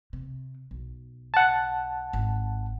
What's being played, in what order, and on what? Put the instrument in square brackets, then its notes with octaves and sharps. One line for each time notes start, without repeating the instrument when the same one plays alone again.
[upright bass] C3
B1
[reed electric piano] F#5 A5
[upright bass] G#1